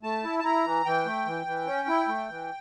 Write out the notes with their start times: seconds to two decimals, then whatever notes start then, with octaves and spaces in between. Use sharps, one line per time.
0.03 A3 A5
0.24 E4
0.39 A5
0.44 E4 A#5
0.65 E3
0.86 E3 G5
1.06 A3
1.26 E3
1.46 E3
1.67 C#4
1.88 E4
2.08 A3
2.29 E3